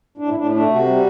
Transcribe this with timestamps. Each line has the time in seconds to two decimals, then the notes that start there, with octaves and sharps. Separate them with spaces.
0.18 A2 D4
0.29 E4
0.35 A2 D4
0.52 A3 D4
0.69 C3 F#4
0.86 G3